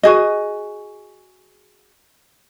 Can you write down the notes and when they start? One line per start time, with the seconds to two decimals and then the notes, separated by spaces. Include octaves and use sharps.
0.03 F#4 G#4 D#5